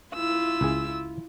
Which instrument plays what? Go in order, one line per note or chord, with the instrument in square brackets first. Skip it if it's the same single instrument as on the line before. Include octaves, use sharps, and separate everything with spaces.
[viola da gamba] E4 F4 [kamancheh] E6
[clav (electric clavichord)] C#2 G#4